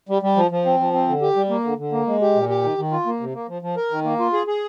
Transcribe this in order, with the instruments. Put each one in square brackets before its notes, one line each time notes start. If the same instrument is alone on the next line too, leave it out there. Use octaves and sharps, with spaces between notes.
[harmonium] G3
G3
F3
F3
C4
F3
C4
D3
G4
G3
A#3
D3
D3
A#3
G#3
G4
A#2
G4
D#3
D#3
F4
A#3
C3
A#3
F3
F3
A#4
D#3
A#3
F4
G#4
G#4